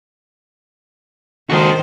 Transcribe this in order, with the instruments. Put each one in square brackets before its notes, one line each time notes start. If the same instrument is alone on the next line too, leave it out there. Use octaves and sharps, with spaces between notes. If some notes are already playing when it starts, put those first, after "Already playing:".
[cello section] D#3 C5 [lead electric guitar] F#4 A4